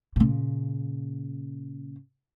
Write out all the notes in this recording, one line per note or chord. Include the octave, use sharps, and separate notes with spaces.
A#2 C#3